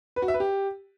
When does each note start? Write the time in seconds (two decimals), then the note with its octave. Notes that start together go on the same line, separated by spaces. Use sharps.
0.16 B4
0.22 F#4
0.28 E5
0.34 B4
0.40 G4